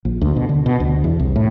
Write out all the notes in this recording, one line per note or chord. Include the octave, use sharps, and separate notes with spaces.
A#1
D2
B2
D3
B2
D2
E2
C2
A2